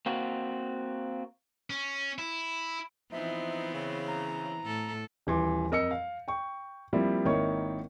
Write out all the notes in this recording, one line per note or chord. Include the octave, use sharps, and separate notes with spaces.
A#3 C4 F#4
C#4
E4
E3 F3 B3 C4 D#4 E5
C#3
A#5
A2 A4
D#1 E3 C6 D6
F2 A#4 D#5 E6 C#7
F5
G5 C#6
F3 G3 A#3 C4 E4
G#1 D#3 A#3 E4 C#5 C#6